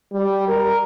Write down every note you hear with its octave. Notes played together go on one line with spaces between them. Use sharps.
G3
A#4